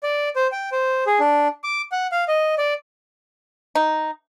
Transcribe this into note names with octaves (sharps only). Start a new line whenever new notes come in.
D5
C5
G5
C5
G#4
D4
D6
F#5
F5
D#5
D5
D#4